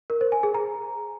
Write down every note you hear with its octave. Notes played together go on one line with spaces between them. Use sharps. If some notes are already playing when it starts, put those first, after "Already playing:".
A#4
C5
G#5
G#4
A#5